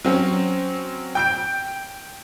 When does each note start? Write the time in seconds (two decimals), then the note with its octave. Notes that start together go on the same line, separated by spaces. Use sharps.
0.05 F#3 C4 C#4
1.15 G5 G6 D7